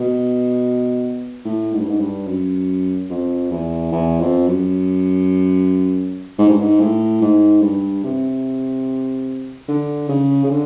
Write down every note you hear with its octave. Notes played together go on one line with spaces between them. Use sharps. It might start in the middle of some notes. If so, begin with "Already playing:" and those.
Already playing: B2
A2
G#2
G2
G#2
G2
F#2
F2
E2
E2
F2
F#2
G#2
G2
G#2
A2
G#2
G2
C3
D3
C#3
C#3
D3